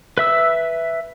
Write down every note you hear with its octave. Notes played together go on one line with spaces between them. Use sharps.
B4 E5 E6